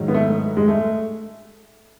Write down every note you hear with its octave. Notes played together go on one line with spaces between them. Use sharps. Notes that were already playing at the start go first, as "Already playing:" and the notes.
Already playing: G#2 D#3 F#3
B3
A3
G#3
A3